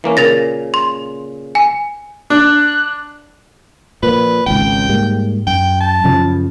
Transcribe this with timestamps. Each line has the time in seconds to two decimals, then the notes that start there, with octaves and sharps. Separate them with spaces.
0.04 E3 A#3 C#4
0.17 A#2 C#3 A#4 A6 A#6
0.74 C6
1.55 G#5
2.30 D4 F#6
4.03 A#2 F3 B4
4.47 G#1 C#2 G5
4.89 G#2 G3 A#3
5.47 F#2 G5
5.81 A5
6.04 F#2 C#3 F3